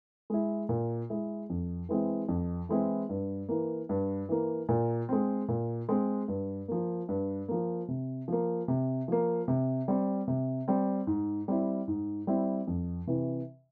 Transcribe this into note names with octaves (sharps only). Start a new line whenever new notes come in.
G#3 E4
A#2
G#3 E4
F2
E3 G#3 C4 E4
F2
E3 G#3 C4 E4
G2
E3 A#3
G2
E3 A#3
A#2
G#3 C4
A#2
G#3 C4
G2
F3 A#3
G2
F3 A#3
C3
F3 A#3
C3
F3 A#3
C3
G3 C4
C3
G3 C4
G#2
G3 C4 E4
G#2
G3 C4 E4
F2
C3 E3